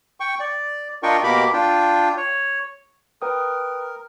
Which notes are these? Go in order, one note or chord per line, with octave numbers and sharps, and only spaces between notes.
G5 C#6
D5
D4 F4 A#4 D#5 G5 C#6
B2 A#3 G4 A#4 B5 D6
D4 F4 G5
C#5
A#4 B4 G5 D#6